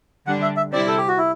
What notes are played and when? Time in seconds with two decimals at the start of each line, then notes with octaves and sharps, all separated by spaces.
0.27 D3 G3 D4 F#5
0.42 E5
0.57 E5
0.73 C3 G3 C4 E4 D5
0.88 A4
0.98 G4
1.08 F#4
1.18 E4